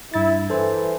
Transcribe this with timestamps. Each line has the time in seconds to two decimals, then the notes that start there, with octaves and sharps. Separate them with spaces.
0.14 G2 E4 A6
0.50 E3 A4 C5